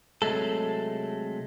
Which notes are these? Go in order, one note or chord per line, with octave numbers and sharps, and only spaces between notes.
C3 F#3 G#3 A3 A4